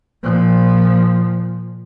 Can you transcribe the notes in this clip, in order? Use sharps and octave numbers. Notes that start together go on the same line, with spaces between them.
A#2 F3